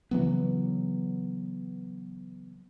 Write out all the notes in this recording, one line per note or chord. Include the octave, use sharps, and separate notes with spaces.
C#3 E3 F#3 B3